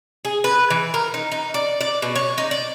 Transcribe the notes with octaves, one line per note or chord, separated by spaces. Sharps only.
G#4
B4
E3
A#4
D#4
D#4
D5
D5
B2
C#5
D#4
D5